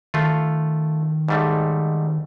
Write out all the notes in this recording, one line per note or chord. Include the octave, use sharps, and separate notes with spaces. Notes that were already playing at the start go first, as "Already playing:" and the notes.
D#3 A3 F4
G#2 G3 A3